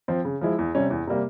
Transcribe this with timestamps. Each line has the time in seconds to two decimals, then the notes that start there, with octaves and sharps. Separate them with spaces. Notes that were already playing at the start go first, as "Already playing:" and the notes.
0.08 F3 C4
0.25 C#3
0.41 F3 G#3 E4
0.59 E2
0.75 C3 G3 C#4
0.90 E2
1.07 C3 G3 A#3